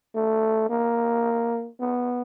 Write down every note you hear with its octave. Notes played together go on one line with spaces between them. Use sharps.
A3
A#3
B3